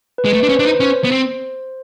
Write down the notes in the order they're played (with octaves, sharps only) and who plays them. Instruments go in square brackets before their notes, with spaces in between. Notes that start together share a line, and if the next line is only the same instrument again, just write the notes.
[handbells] B4
[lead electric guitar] G#3
A3
[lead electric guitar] D4 [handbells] B4
[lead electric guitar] C#4 [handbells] C5
[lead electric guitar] D4 [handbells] B4
[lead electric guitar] D#4
[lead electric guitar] C#4 [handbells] C5
[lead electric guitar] B3
C4